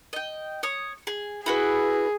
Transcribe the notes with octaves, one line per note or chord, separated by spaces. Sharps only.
D#5 G5
C#5 D#6
G#4
E4 F#4 G#4 B4